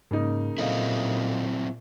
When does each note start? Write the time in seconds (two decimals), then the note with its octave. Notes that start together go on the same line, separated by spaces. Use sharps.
0.11 G#2 C#3 A#3 D#4
0.58 A#2 F#3 C4 E4 A4 D#5 F5